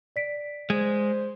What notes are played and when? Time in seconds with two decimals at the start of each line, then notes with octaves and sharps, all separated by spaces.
0.16 D5 B6 D7
0.70 G#3 C5